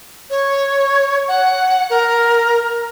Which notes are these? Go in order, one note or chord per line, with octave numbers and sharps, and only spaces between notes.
C#5
F#5
A#4